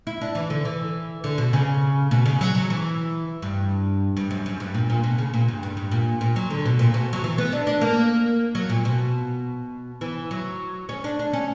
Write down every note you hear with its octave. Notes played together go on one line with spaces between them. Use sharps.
E4
D4
E3
D3
E3
D3
B2
C#3
B2
C#3
F#3
F#3
E3
G2
G2
F#2
F#2
G2
A#2
A#2
B2
C#3
A#2
G2
G2
G2
A#2
A#2
F#3
D3
B2
A#2
B2
F#3
E3
B3
D4
D4
A#3
F#3
A#2
B2
E3
F#3
C#4
D4
D4
C#4